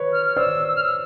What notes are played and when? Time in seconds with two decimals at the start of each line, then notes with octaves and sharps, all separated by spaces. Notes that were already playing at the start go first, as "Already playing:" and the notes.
Already playing: B4 C#5
0.12 F6
0.25 F6
0.36 C5 D5 E6
0.68 E6
0.76 F6
0.83 E6